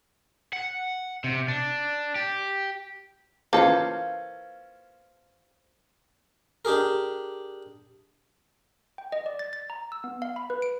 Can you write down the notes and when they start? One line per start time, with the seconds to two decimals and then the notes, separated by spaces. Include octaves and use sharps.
0.53 F#5
1.24 C3
1.48 D4
2.15 G4
3.53 E3 A#3 C#4 F4 A4 C5 F5
6.65 D4 G4 G#4 A#4
8.98 G5
9.12 D#5
9.26 D5
9.39 A6
9.53 A6
9.70 A#5
9.92 E6
10.04 B3
10.22 F5
10.36 B5
10.50 B4
10.62 D7